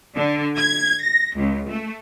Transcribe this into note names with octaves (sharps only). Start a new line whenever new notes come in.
D3
G#6
A#6
C#2
A3